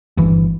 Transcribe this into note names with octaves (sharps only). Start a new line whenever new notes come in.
G1 G2 E3